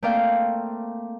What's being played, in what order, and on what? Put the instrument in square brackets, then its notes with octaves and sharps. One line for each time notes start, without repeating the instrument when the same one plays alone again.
[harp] A3 A#3 C4 D5 F5 G5